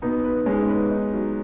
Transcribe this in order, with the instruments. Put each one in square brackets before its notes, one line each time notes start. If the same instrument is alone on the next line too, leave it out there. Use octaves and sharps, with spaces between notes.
[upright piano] B2 [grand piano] B3 D#4
[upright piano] B4
[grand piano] G#3 C#4 [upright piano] D#4
[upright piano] B4
D#4
F#3